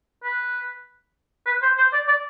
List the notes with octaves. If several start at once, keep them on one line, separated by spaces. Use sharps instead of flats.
B4
B4
C5
C5
D5
D5